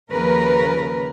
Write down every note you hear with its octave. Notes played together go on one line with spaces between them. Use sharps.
D#2 C#3 F3 A#4 B4